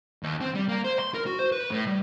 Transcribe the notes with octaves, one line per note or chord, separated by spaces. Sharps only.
D#2
C4
G3
A#3
C5
C6
A#4
F#4
C5
B4
A2
G3